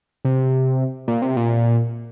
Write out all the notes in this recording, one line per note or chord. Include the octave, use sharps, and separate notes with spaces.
C3
A#2
C3
A#2